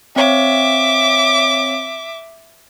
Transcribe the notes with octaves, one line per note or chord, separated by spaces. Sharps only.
C4 C#5 E5 F5 D6